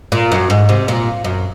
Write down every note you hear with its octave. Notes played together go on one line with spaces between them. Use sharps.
A#2
F#2
G#2
C3
A#2
F#2